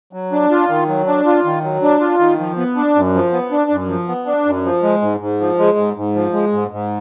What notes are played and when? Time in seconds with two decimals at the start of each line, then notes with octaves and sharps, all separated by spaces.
0.13 F#3
0.32 D4
0.51 F4
0.69 D#3
0.88 F#3
1.07 D4
1.26 F4
1.44 D#3
1.64 F#3
1.82 D4
2.01 F4
2.19 D#3
2.39 F3
2.57 B3
2.76 D4
2.95 F#2
3.14 F3
3.32 B3
3.51 D4
3.71 F#2
3.88 F3
4.08 B3
4.26 D4
4.45 F#2
4.65 F3
4.83 G#3
5.02 G#2
5.20 G#2
5.40 F3
5.59 G#3
5.78 G#2
5.96 G#2
6.15 F3
6.33 G#3
6.52 G#2
6.71 G#2